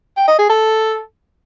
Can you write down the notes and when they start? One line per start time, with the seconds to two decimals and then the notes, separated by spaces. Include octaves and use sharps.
0.17 G5
0.28 D#5
0.39 G#4
0.49 A4